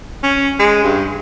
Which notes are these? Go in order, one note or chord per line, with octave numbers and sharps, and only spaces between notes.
C#4
G#3
G2